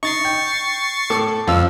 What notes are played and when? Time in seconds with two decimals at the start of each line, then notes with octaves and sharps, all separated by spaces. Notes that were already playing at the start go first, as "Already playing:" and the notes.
0.03 D#4 C#6 A6 C7
0.25 G5
1.10 A2 A4 D6
1.47 F2 F3 F5 E6